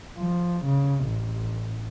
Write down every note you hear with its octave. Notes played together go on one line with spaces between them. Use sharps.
F3
C#3
A1